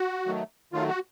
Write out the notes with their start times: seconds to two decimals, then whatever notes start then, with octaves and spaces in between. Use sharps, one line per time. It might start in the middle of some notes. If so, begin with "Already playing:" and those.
Already playing: F#4
0.26 D#3 F#3 A3
0.73 D#3 F#3 A3 F4
0.89 F#4